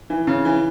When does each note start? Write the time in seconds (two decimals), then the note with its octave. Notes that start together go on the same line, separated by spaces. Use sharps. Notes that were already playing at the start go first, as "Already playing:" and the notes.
0.10 E3
0.27 C#3
0.45 E3